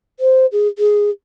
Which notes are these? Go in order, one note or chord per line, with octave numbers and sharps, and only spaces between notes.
C5
G#4
G#4